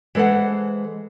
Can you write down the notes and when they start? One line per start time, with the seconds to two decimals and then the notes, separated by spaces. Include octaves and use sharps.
0.15 E3 G#3 A4 C5 F#5